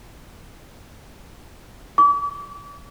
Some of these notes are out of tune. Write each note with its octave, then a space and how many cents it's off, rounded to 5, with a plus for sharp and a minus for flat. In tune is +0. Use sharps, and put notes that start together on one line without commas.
D6 -40